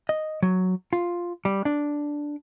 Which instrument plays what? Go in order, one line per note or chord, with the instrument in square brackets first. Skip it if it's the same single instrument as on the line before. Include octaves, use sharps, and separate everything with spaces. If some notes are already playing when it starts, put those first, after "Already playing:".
[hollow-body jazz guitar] D#5
F#3
F4
G3
D4